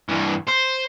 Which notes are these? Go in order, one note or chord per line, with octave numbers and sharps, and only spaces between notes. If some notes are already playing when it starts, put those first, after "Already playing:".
G2 E3
C5